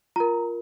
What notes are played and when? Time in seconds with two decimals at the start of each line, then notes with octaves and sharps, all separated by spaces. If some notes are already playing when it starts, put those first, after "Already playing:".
0.16 F4 A#4 A#5